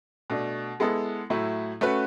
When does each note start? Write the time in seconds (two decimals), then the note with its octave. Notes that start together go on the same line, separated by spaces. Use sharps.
0.30 B2 A3 D4
0.80 G#3 B3 E4 A4
1.30 A2 F#3 A3 E4
1.81 A3 C#4 F#4 B4